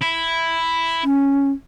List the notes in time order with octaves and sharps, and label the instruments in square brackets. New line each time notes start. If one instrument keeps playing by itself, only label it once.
[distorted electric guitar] E4
[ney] C#4